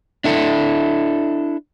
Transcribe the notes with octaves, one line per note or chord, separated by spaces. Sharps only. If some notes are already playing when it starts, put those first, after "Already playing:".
D4 E4 A4